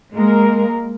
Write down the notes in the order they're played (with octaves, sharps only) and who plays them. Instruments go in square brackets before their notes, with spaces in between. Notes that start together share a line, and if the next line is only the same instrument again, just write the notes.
[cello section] G#3 A#3 A#4